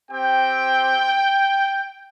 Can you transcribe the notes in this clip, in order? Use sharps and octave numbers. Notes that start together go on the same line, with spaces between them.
C4 G4 G5